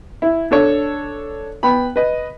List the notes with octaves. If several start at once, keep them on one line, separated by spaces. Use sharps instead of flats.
E4
D4 A4 C#5
B3 G5 B5
B4 D#5